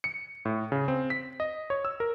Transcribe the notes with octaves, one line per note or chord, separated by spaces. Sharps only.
C#7
A2
C#3
C4
B6
D#5
C#5
E6
A#4